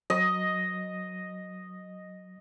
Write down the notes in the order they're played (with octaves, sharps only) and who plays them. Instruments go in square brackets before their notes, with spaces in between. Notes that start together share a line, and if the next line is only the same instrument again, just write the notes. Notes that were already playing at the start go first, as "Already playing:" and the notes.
[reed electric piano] F#3 [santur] D#5